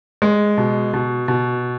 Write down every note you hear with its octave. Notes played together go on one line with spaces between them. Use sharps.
G#3
B2
B2
B2